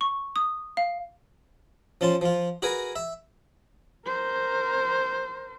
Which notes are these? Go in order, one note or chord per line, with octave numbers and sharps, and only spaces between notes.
C#6
D#6
F5
F3 C#4 A5 C6
F3 F4
F#4 G#4 A#4 B4 G#5
E5
A#4 C5